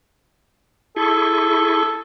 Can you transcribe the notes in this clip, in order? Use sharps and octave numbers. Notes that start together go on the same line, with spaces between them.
E4 G#4 A4 C#6